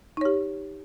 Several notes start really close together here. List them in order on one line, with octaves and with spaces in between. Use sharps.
D#4 C#5 G4